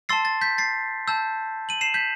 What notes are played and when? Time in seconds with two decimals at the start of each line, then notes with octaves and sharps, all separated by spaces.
0.09 A5 C6 E6 A6 C7
0.25 A6
0.41 G6 B6
0.58 A6 C7
1.08 A5 E6 G6
1.69 D#7 F#7
1.81 C7 E7
1.94 G6 B6